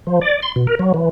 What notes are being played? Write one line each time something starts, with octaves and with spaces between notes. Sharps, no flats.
F3
D5
C6
B2
A#4
F#3
E3